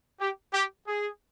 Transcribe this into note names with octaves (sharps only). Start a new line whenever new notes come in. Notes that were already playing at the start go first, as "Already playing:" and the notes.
G4
G4
G#4